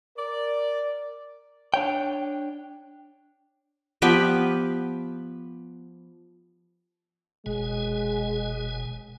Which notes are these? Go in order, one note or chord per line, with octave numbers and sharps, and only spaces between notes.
A#4 D5
D4 C#5 G5
F3 B3 G4 B4
F#1 B2 G#3 G#5